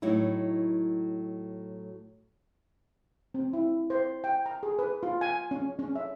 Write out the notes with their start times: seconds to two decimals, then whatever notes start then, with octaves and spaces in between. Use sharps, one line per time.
0.02 A2 F#3 D#4 E4
3.34 C4
3.53 E4
3.90 C5
4.24 G5
4.46 A#5
4.63 G#4
4.79 B4
5.03 F4
5.21 G#5
5.51 C#4
5.79 C#4
5.95 E5